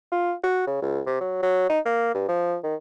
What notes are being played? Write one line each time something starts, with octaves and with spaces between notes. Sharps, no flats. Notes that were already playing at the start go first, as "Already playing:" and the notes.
F4
F#4
C#3
C#2
C3
F#3
F#3
D#4
A#3
G2
F3
D#3